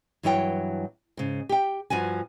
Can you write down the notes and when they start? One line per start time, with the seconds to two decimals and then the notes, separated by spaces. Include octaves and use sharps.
0.23 G2 E3 F#3 E4 C#5 G5
1.17 G#2 C#3
1.49 G4 G5
1.90 G2 F3 F#4 G#5